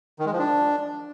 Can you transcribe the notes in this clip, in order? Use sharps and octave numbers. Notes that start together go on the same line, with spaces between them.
D#3
G#3
F3
D4